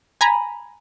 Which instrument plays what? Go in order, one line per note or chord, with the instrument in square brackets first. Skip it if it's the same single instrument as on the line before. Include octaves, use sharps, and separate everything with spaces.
[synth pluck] G#5 A#5 B5